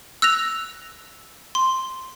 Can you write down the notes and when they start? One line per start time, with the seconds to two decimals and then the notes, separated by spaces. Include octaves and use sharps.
0.22 E6 F#6 A#6 F7
1.55 C6